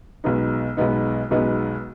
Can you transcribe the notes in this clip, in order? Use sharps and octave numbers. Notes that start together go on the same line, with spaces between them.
B1 B2 G#3 B3 D#4
B1 B2 G#3 B3 D#4
B1 B2 G#3 B3 D#4